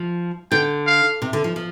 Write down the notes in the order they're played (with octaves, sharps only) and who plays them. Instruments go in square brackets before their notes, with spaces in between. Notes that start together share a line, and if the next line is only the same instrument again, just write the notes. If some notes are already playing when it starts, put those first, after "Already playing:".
Already playing: [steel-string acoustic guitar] F3
[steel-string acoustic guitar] D3 [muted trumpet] G5
[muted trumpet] F5
[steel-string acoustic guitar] C3
D3
F3
F3